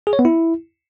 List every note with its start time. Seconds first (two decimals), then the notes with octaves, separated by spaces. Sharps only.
0.07 G#4
0.13 C#5
0.19 B3
0.25 E4